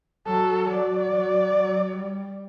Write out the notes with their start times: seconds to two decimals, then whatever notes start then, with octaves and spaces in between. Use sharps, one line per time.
0.26 F#3 A4
0.69 F#3 D5
1.12 F#3
1.54 F#3
1.96 G3